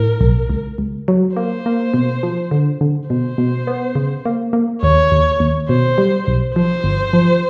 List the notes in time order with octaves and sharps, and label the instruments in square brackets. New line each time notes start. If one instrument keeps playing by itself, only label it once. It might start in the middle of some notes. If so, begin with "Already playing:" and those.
Already playing: [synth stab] A2 [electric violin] A#4
[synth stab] B1
C#2
C#2
F#3
[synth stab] A#3 [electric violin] C5
[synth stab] A#3
B2
F3
D3
D3
[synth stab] B2 [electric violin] C5
[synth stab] B2
B3
C#3
A#3
A#3
[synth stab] D#2 [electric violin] C#5
[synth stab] D#2
D#2
[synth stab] B2 [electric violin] C5
[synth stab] G3
B1
[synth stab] F3 [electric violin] C5
[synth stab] G1
F3